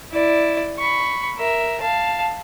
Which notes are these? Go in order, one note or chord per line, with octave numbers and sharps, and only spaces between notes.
E4 D5
B5 C#6
A#4 E5
F5 A5